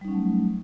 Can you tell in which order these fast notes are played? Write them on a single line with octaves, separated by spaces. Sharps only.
G3 D#4 C#4 F#3 A3